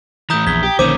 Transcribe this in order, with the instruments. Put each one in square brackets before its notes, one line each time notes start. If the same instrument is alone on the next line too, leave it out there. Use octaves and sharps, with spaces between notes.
[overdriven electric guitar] A2 E3 [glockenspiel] A#5 D#6 G6
[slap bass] A#1 [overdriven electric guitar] E2 [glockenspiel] G#6 B6 G7
[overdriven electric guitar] G4
[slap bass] A#1 D3 A#3 [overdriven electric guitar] D#3 C#4 [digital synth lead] C5 [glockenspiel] D6 D#7